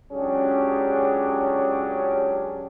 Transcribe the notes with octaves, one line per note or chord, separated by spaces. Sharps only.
C#2 F#3 C#4 D4 G4 G#4